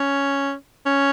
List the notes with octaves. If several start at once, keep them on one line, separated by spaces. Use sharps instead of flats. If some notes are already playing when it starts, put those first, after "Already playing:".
Already playing: C#4
C#4